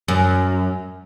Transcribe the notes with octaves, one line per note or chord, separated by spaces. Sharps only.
F#2